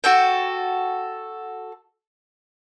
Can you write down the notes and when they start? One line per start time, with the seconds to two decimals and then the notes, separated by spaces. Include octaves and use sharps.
0.04 F#4 A4 G5